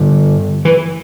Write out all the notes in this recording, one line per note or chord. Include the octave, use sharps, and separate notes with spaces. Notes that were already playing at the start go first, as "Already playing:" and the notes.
Already playing: G2 D3
E3